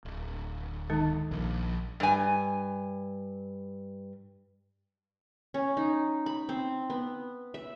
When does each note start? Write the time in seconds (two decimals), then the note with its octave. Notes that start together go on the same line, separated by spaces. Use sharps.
0.05 D1
0.90 D#3 G#3 D#4
1.31 A#1
2.00 G2 G#5
5.54 C#4
5.77 D#4
6.26 B5
6.49 C4
6.90 B3
7.54 E5